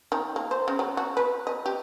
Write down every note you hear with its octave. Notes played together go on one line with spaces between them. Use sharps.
D#3
A#3
C5
C#3
F#3
F#4
B4
D#5
G4